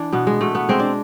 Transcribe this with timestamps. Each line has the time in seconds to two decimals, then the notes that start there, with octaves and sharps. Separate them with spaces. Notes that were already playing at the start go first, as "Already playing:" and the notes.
Already playing: E3 D4
0.12 B2 B3
0.27 G#3
0.41 B2 A3
0.55 B3
0.69 G#3 C4
0.80 D4